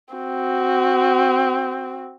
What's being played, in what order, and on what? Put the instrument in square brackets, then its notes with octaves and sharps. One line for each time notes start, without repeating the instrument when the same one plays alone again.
[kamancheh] C4 F#4